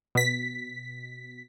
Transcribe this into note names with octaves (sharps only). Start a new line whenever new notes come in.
B2 B6